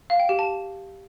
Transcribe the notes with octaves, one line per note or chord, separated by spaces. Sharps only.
F5
G5
G4
A5